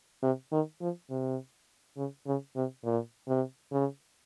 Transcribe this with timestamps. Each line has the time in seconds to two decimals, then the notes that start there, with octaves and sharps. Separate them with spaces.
0.23 C3
0.52 D#3
0.81 F3
1.10 C3
1.97 C#3
2.27 C#3
2.56 C3
2.85 A#2
3.28 C3
3.72 C#3